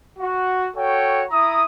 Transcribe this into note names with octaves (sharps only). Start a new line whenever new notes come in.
F#4 F#5
F#4 A4 C#5 G5
E4 A#5 D#6